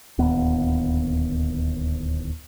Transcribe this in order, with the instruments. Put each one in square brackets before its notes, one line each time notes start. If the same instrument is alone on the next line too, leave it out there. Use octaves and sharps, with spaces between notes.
[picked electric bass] D1 D#2 B3